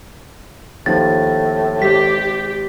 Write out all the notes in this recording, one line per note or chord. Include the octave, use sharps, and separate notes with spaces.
D#2 A2 D#3 F3 A6
G#1 G4 B6